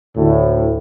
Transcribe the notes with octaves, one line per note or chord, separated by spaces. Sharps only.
D2 A2